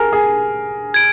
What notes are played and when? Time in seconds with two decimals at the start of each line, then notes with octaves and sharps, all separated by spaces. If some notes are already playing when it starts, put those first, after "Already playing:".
Already playing: G#4 A#4
0.13 G#4
0.94 G#6 D7